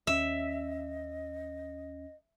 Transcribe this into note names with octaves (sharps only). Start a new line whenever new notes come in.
D#2 C#4 D#5 E5